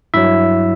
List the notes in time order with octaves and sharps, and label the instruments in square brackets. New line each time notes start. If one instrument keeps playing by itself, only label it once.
[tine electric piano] G2 F#3 E4 E5